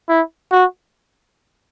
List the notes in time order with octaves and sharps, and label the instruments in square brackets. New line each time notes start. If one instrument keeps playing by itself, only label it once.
[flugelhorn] E4
F#4